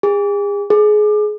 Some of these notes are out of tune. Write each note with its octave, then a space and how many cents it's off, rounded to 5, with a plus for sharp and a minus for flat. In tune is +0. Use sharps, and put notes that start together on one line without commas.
G#4 -40
G#4 +25